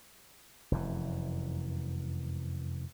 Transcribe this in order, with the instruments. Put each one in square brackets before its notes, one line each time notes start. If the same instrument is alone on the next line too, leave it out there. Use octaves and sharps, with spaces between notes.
[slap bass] F1 F#2 E3